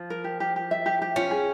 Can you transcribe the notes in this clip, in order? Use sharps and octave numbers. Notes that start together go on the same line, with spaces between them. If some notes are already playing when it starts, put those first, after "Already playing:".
Already playing: F3
A#4
G4
G4
G4
E5
G4
G4
C#4 F4
G#4